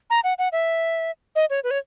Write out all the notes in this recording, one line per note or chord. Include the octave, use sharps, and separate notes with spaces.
A#5
F#5
F#5
E5
D#5
C#5
B4
C#5